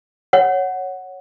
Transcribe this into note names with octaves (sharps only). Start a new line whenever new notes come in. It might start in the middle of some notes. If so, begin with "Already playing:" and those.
C#5 F#5